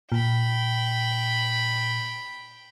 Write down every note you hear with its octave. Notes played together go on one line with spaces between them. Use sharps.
A#2 G5 B5